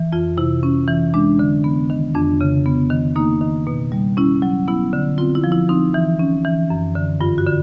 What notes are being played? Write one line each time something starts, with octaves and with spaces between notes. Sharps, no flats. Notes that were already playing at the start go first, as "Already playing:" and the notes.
Already playing: E3
F2 F4
C3 E4
C#4
E3
G#3 D4
D3
B3
D#3
F2 D4
C#3
B3
D#3
A#3 D#4
D#3
B2
G3
C#4 E4
F#3
B3 E4
D3
C4 F4
E4
F3
E4
C4 D#4
E3
C#4
E3
F#2
D3
G2 F4
F#4
D3